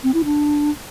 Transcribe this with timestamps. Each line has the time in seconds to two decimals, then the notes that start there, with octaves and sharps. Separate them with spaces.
0.04 C4
0.14 E4
0.25 D4